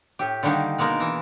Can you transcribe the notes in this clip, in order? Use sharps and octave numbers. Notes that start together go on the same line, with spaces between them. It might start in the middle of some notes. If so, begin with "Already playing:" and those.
A2 G4
D3 D#3 G3 A#3 D#4
B2 G#3 A#3 D#4 A#4
E3